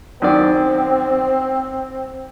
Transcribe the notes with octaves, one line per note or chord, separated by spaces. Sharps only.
F#2 D#3 C4 D5